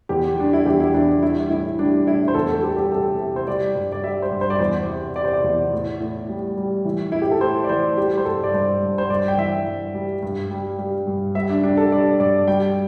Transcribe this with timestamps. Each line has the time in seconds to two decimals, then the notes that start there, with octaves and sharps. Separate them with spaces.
0.09 E2 G4
0.39 G3 D4
0.53 E4
0.66 E2 G4
0.80 E4
0.94 E2 D4
1.22 G3 E4
1.50 A2 E4
1.79 G3 D4
2.07 A2 E4
2.28 C5
2.34 E2 A4
2.48 A4
2.63 G3 G4
2.77 G4
2.92 C3 A4
3.19 C3
3.36 C5
3.48 G3 D5
3.76 G2
3.92 D5
4.03 G3 E5
4.22 C5
4.32 G2
4.41 C5
4.50 D5
4.59 E2 C5
4.88 C3
5.16 C3 D5
5.24 C5
5.33 D5
5.44 E2
5.73 A2
6.00 A2
6.29 G3
6.57 G3
6.85 E3
7.12 A2 E4
7.22 G4
7.31 A4
7.41 A2 C5
7.64 D5
7.69 E3 C5
7.97 G3 G4
8.17 C5
8.25 G2 A4
8.44 D5
8.54 G2 C5
8.83 G2
8.98 C5
9.10 G2 D5
9.28 G5
9.38 E3 E5
9.67 G2
9.95 G3
10.23 G2
10.51 G3
10.79 G3
11.07 G2
11.35 G3 E5
11.50 D4
11.63 G3 D4
11.77 A4
11.92 G3 D5
12.20 G2 D5
12.48 G3 G5